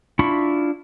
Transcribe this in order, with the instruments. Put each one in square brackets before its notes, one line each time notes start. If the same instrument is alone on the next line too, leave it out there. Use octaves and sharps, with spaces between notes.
[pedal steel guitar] D4 E4 F4 B5 C#6